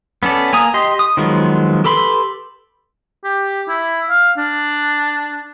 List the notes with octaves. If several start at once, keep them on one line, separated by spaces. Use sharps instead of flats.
B3 C#4 A4 D5
A#3 G#5 A#5 D#6
G4 D#5 C6
D#6
D#3 F3 F#3 G#3 B3
G4 A4 B4 B5 C6
G4
E4
F5
D4